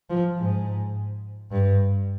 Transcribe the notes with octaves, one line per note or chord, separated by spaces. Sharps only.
F3
G#2
G2